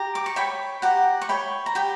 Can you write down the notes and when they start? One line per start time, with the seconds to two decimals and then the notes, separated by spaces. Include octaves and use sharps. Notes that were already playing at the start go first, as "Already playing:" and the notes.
Already playing: G4 A#5
0.15 D6
0.26 C#6
0.36 C#5 G5 B5
0.82 G4 F#5 A#5
1.21 C#6
1.29 C#5 G5 B5
1.66 A#5
1.75 G4 G5 B5